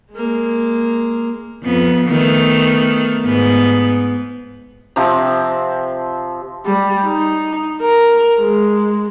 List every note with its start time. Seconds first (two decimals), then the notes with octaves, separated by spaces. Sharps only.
0.12 G#3 A#3
1.63 F2 B3
2.08 D#3 A3 B3
3.25 G#2 B3
4.96 C3 F3 C4
6.66 G3
7.05 D#4
7.82 A#4
8.40 G#3